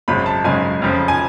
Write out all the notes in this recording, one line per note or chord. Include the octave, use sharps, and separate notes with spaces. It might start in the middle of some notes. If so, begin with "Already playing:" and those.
G#1 F#2 C#3 G#3 B5
A5
G#1 F#2 C#3 G#3 G#5
F1 F2 C#3 F3
G#5